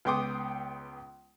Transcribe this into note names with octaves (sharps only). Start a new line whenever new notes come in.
C#2 B3 G5 C6 D6 D#6